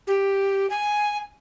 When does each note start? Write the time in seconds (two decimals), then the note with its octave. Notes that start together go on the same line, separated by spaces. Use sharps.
0.07 G4
0.70 G#5